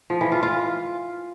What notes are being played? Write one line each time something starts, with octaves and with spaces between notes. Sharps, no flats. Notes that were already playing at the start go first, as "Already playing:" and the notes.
F3
E3
F4
F4